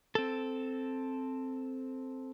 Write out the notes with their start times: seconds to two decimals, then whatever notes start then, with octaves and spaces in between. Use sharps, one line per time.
0.15 C4 A4